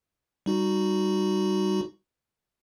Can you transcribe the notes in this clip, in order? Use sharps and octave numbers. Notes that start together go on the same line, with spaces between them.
G3 D#4 F#4